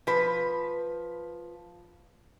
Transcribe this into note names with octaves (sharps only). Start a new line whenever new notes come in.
F3 B4